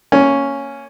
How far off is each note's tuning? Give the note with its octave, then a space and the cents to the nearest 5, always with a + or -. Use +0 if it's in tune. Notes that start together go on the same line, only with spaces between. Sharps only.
A#3 -10 C#4 +0